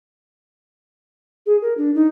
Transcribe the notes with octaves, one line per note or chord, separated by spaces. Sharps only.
G#4
A#4
D4
D#4